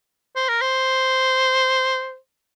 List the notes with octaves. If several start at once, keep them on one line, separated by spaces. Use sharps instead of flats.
C5
A#4
C5